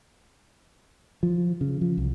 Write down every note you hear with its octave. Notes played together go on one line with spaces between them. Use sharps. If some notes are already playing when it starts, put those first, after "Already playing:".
F3
C#3
F3
C2